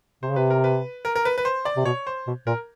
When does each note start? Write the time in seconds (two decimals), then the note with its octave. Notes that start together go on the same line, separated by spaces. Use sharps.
0.23 C3 C5
0.30 C#3
0.36 C3 B4
0.50 A#4
0.64 B4
1.05 A#4
1.15 A#4
1.25 B4
1.38 B4
1.45 C5
1.65 D5
1.76 C3
1.85 B2 C#5
2.07 C5
2.27 B2
2.47 A#2 A#4